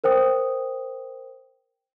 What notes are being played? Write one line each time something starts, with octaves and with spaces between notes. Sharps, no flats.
A#4 C5 G5 D#6